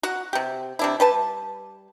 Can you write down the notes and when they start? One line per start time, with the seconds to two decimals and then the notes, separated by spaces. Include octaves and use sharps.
0.03 F#4 F#5
0.33 C3 G4
0.79 C3 D4 E4
1.00 G3 B4 A5